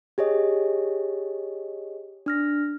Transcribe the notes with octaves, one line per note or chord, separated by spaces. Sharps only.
G4 G#4 C#5 D#5
D4 F6 A#6